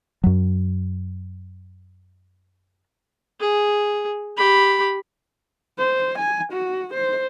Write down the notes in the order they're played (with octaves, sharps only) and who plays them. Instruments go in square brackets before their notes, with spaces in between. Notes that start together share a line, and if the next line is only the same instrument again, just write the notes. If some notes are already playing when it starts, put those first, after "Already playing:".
[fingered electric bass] F#2 F#3
[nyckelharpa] G#4
G4 B5
[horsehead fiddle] C5
G#5
F#4
C5